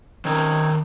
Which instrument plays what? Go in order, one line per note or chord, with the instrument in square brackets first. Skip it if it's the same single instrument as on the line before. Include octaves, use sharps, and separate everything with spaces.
[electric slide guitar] D#3 C#4 A#4 [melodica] C4 D#4 C#5